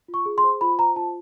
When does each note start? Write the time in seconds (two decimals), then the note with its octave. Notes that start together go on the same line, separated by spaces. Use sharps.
0.08 F4
0.14 C#6
0.26 G#4
0.38 C6
0.44 C5
0.61 F4 B5
0.79 C5 A#5
0.96 F4 A5